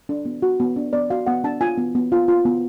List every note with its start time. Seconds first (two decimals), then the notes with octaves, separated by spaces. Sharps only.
0.09 D4
0.25 B3
0.42 F#4
0.60 B3
0.76 D4
0.93 B3 D5
1.10 F#4 F5
1.27 B3 F#5
1.44 D4 A5
1.61 F4 G#5
1.78 B3
1.95 B3
2.12 F4
2.28 F4
2.45 B3